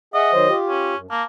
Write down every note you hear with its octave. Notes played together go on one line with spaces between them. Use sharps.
G#4 D#5 E5 F#5
D#3 F#3 C5
F4 G4
C#4
F#2
A#3 A5